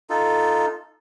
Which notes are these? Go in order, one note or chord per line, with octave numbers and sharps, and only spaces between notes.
D#4 F4 A4